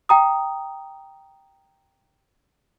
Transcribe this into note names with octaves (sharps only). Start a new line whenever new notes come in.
G5 A#5 D#6